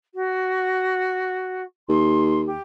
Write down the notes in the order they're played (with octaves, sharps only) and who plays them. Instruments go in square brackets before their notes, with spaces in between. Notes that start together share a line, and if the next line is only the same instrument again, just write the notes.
[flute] F#4
[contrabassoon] D#2 [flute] C6
[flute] G4